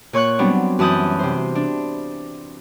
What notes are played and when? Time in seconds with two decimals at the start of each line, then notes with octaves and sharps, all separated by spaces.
0.13 A#2 C#5 C#6 F#6
0.39 F#3 G3 B3 C4 D4
0.79 F#2 E3 A5 D#6 F#6 G6
1.19 C3 C5
1.55 D4